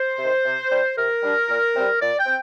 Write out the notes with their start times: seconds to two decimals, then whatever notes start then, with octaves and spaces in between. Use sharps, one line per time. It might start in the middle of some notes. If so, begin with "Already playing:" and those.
Already playing: C5
0.18 C3 D#3
0.45 C3
0.70 G3 D4
0.96 C3 A#4
1.23 G3 D4
1.48 A#2
1.75 G3 C4
2.00 A#2 D5
2.18 G5
2.26 C4